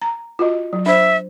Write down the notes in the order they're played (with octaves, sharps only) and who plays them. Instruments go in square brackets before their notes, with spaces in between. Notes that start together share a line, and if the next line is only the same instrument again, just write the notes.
[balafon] A#5
F4 F#4 D#5
F#3
[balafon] D4 C5 [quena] E5